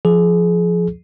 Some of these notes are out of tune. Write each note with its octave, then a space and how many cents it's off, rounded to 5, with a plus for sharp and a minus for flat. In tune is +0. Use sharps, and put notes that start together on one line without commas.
F3 +0 G#4 +30